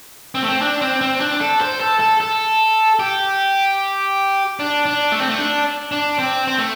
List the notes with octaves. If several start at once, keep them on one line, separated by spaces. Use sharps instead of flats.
C4
A3
C4
D4
C4
C4
D4
A4
C5
A4
A4
A4
G4
D4
D4
A3
C4
A3
D4
D4
C4
C4
A3